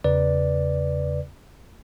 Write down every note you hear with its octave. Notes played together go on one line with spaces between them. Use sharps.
E2 C#3 B4 D5